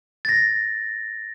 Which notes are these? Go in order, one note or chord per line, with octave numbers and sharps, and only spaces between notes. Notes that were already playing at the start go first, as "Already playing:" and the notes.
A6 A#6